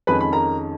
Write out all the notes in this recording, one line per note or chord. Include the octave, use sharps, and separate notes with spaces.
F2 D#3 G#3 C#4 B4 B5
B5
A#4 A#5